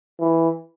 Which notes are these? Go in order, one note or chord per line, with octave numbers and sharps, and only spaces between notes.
E3